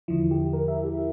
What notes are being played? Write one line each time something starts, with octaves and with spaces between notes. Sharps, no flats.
E2 D3 F3 E4
G4
A#4
E5
G4